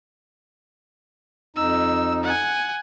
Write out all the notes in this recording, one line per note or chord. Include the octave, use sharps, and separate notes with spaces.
F2 D#4 E6
F#5 G#5